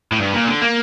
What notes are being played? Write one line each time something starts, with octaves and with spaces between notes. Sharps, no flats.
A2
G2
A#2
D3
A#3